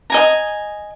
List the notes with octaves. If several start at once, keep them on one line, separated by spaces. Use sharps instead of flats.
D#5 G#5 A#5